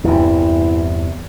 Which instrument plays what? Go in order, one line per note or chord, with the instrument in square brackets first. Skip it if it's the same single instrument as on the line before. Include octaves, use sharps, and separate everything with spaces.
[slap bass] E2 G2 C3 [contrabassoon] E3